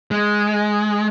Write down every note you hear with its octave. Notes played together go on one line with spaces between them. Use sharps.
G#3